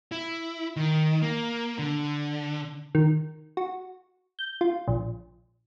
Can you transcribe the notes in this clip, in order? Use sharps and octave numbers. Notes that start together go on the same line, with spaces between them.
E4
D#3
A#3
D3
D#3
F#4
G6
F4
A#1